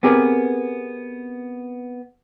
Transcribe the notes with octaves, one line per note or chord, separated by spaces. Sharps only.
B3 C4 G4 G#4 A#4 B4